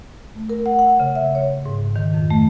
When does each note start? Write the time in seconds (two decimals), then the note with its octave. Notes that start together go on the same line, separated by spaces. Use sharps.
0.35 A3
0.50 A#4
0.66 F#5
0.79 F#5
1.00 C#3
1.15 E5
1.35 C#5
1.66 G#2
1.96 D#3
2.14 F2
2.30 A3